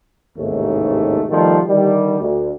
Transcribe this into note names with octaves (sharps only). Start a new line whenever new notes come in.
A1 D#2 G#2 C3 A3
B2 D#3 F3 G3 A3
D3 D#3 G3
D2